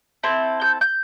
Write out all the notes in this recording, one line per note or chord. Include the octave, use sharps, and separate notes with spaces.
C4 E4 A4
G6
G6